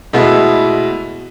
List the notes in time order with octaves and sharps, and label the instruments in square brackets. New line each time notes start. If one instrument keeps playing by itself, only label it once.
[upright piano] B2 G#3 A3 B3 E4